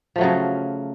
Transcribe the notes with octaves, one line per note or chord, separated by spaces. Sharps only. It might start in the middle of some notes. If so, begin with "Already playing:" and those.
C#3 F3 F#3 A3